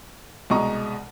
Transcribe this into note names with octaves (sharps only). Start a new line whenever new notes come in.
C2 B2 G#3 D#5 A#5 C#6